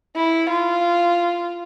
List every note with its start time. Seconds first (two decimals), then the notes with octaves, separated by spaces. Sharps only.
0.16 E4
0.49 F4